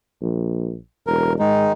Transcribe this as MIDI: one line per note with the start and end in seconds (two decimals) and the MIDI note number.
0.22 0.76 34
1.07 1.38 28
1.07 1.33 70
1.39 1.67 44
1.39 1.72 51
1.39 1.72 56
1.39 1.72 63